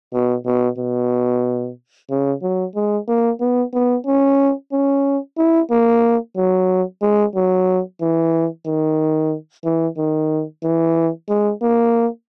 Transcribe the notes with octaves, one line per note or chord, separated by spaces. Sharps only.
B2
B2
B2
C#3
F#3
G#3
A#3
B3
B3
C#4
C#4
E4
A#3
F#3
G#3
F#3
E3
D#3
E3
D#3
E3
G#3
A#3